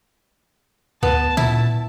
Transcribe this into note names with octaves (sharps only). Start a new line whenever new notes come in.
D2 B3 A5
A#2 E4